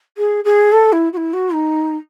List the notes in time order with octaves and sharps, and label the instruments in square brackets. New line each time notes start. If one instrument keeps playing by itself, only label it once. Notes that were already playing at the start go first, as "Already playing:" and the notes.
[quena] G#4
G#4
A4
E4
F#4
E4
F#4
D#4